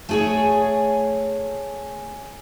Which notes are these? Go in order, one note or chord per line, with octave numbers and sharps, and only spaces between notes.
A3 G#4 C#5